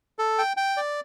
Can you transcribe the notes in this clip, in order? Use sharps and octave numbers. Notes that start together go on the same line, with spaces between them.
A4
G5
G5
D5